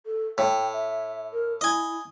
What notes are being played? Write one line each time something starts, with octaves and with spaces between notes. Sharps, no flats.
A4
A2 G5
E5
A#4
E4 D#5 G#5